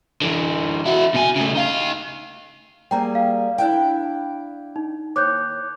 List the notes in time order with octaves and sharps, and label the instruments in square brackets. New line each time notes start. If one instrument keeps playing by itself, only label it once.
[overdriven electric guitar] D3 E3
E4 F#4
B2 G#5
C#3 A3
D#4 F5
[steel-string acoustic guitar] G3 A#3 G#4 [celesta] G5 A#5
[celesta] F5
[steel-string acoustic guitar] D4 E4 G5
[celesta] D#4
[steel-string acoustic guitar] D#2 C#5 [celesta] D6 F#6 G6